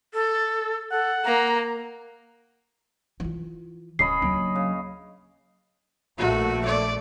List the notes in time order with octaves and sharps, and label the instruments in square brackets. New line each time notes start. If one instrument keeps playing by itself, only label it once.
[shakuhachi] A4
[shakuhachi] A4 [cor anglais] F#5
[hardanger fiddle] A#3 [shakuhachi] A#5
[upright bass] E3 F4
[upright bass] D1 [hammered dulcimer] C#4 D#5 B5 [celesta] C7
[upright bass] D2 [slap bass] F#3 A#3 D4
[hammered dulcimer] C#3
[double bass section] A#1 A3 [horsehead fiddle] F#4
[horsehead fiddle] D5